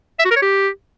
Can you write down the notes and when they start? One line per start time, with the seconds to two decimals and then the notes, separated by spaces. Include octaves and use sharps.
0.19 E5
0.25 F#4
0.30 A#4
0.36 C#5
0.42 G4